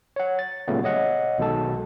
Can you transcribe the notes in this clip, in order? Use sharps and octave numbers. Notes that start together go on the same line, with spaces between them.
C#5 F#5
A6
A#2 C#3 F#3 G3 A3 B3
C#5 D#5 F#5
B1 B2 D#3 G#3 A4 A5